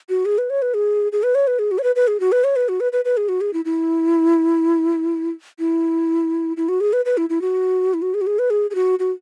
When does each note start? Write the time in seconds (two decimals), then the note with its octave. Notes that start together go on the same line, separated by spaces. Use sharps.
0.09 F#4
0.25 G#4
0.38 B4
0.50 C#5
0.62 B4
0.74 G#4
1.12 G#4
1.23 B4
1.35 C#5
1.47 B4
1.59 G#4
1.71 F#4
1.78 C#5
1.83 B4
1.96 B4
2.08 G#4
2.20 F#4
2.32 B4
2.44 C#5
2.56 B4
2.69 F#4
2.80 B4
2.92 B4
3.05 B4
3.17 G#4
3.29 F#4
3.41 G#4
3.53 E4
3.65 E4
5.59 E4
6.57 E4
6.69 F#4
6.81 G#4
6.93 B4
7.05 B4
7.17 E4
7.30 E4
7.42 F#4
7.94 E4
8.02 F#4
8.14 G#4
8.21 F#4
8.27 G#4
8.39 B4
8.50 G#4
8.71 G#4
8.75 F#4
8.99 F#4